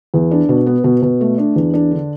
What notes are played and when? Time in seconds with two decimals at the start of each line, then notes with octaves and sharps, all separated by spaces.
0.14 E2
0.31 D4
0.49 B2
0.66 B3
0.84 B2
1.02 B2
1.21 A3
1.38 D4
1.56 E2
1.74 D4
1.91 D3